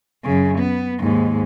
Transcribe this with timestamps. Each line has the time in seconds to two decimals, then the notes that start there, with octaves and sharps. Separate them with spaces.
0.24 F#2 C#3
0.57 B3
0.99 D#2 G#2